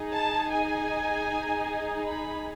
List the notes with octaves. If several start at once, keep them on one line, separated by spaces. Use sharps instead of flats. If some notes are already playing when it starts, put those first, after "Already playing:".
Already playing: D#4 G#4
A5
G#5
B5